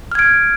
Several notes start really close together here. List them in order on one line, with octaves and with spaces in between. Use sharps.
F6 G#6 D7